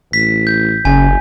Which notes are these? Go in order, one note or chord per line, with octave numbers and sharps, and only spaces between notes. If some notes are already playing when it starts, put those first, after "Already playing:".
A1 B6
G6
F#1 C#3 G#5